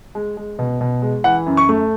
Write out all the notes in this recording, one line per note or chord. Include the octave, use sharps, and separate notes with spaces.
G#3
G#3
B2
B2
G#3
E3 F#5
F#2
C#6
A3